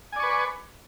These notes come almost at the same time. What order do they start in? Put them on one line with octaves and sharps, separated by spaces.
G#5 D5 C#6 B4